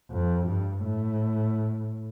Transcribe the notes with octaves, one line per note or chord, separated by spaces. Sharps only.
F2
G2
A2